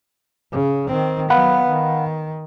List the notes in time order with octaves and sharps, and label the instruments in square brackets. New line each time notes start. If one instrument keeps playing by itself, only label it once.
[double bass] C#3
D#3 C4
[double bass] F#3 B3 [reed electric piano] F5 F#5 B5
[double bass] D#3